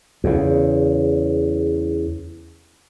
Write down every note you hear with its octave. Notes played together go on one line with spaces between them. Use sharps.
E2 C#3